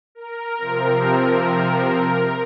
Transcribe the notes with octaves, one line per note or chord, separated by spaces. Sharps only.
A#4
C3 F3 C4